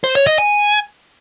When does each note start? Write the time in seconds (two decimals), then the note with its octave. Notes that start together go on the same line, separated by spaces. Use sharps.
0.04 C5
0.15 C#5
0.27 D#5
0.38 G#5